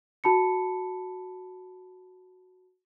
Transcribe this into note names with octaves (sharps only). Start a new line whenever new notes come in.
F#4 A5 B5 C#7